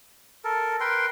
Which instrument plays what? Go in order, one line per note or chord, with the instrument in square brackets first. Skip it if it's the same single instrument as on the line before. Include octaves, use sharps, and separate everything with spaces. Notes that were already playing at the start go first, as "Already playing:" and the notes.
[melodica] A4 A#4
A#4 B4 G5 C6